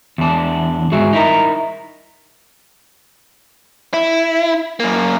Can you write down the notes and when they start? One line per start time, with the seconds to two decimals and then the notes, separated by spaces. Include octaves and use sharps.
0.18 E2 D4
0.92 G#2 F#4 G#4 E5
1.13 D#4 E4 A#4
3.94 E4
4.80 F#2 A#3